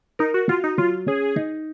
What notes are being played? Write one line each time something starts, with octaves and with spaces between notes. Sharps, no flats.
D#4 A#4
F#4
F4 F#4
D#4
F#3 F4
C#4 G#4
D#4